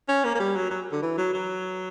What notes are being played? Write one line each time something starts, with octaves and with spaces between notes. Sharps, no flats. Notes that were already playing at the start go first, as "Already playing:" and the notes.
C#4
A#3
A#3
G3
F#3
F#3
D3
E3
F#3
F#3